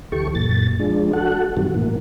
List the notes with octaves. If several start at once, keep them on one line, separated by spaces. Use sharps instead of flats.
D2 E3 G4 A4 C#6
F#2 A#2 A6
F3 G#3 D4
F#4 A4 F#5
G2 C3 D#3 E3 F#3 G3
A2 E3 A#3